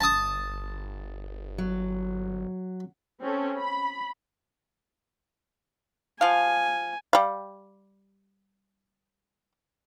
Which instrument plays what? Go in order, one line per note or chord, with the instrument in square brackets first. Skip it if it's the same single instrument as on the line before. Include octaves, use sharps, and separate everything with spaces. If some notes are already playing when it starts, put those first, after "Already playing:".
[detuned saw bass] G1 [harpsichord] A5 D#6
[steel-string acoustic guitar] F#3
[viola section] C4 C#4 A4
B5
[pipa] F3 F5 [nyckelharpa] G#5
[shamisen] G3 F5